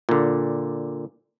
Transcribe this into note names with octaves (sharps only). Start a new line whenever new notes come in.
A#2 D3